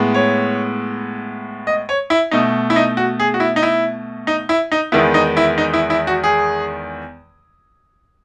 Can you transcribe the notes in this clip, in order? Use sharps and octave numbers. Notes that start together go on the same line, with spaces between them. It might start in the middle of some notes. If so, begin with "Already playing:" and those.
Already playing: A2 G#3 B3
C#5
D#5
C#5
E4
B2 A3 D#4
E4
D#4
F#4
G#4
F#4
E4
D#4
E4
D#4
E4
D#4
E2 D#3 G#3 B3 E4
D#4
E4
D#4
E4
E4
F#4
G#4